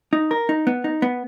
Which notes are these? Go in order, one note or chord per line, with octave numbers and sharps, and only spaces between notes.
D#4
A#4
D#4
B3
D#4
B3